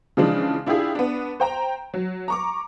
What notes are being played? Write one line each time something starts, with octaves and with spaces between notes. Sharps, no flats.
C#3 E3 F3 G#3 D4
D4 E4 F4 G4 G#4
B3 D4
C5 G5 A#5
F#3
A#5 C#6 D6